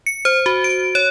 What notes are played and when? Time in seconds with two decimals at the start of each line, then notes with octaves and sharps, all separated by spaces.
0.06 C#7
0.25 C5
0.46 F#4
0.64 D7
0.95 C#5